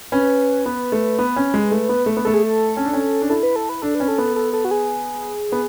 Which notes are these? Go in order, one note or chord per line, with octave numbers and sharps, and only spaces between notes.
C#4 B4
B3
A3
B3
C#4
G#3
A3
B3
A3
B3
A3 A4
G#4
A4
C#4
D4
C#4
D4
E4 A4
B4
A4
B4
D4 A4
B4
C#4
A4
B3
A4
A4
F#4
G#4
B3